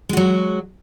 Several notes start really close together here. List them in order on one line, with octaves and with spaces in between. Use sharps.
G#3 F#4 F#3